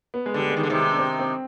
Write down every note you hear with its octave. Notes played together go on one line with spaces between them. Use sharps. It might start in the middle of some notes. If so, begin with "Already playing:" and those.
B3
G#3
D3 G3
G#3
D#3
D3
C3 D#3
D4
C4
C4